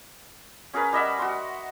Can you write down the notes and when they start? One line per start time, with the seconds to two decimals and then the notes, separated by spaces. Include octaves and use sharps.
0.73 C#4 G#4 A#4 B4
0.93 G3 D#5 E5 F#5
1.19 F#4 C6